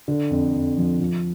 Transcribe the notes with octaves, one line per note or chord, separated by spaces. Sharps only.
D3
F2
F2
F3
F3